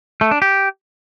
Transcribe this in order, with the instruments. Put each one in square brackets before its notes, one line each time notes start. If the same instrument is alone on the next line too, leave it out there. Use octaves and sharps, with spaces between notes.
[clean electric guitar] A3
D4
G4